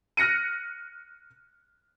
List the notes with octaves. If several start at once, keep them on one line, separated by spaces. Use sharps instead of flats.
F6 F#6 A#6 C#7 D#7